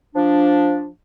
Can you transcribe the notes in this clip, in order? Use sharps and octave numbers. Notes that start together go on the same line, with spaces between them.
F3 D4